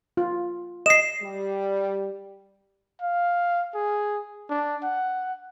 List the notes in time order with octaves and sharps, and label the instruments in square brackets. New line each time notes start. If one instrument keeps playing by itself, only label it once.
[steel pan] F4
[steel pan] D#5 [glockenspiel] C7 E7
[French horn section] G3
[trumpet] F5
G#4
D4
F#5